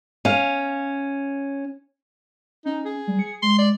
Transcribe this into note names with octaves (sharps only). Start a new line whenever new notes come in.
C#4 F5
C#4 D#4
G#4
G3
C#7
G#3 C6
D5